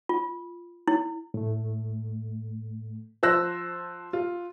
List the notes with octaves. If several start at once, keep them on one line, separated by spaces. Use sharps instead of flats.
F4
E4
A2 A3
F3 C5 A5 E6 F#6 A#6
F4